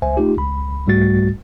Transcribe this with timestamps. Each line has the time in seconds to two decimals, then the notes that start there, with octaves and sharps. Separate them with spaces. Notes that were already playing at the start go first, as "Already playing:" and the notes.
0.02 C#2 C5 E5 G#5
0.17 A3 D#4 F4 G4
0.38 C#2 B5
0.86 C2 G#2 G3 A3 F#4 A6